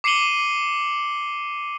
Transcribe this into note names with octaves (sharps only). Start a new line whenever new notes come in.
D6 C7 C#7 D#7 F#7 G7